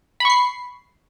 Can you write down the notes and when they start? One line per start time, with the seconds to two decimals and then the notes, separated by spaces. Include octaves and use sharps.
0.20 B5
0.25 C#6
0.30 C7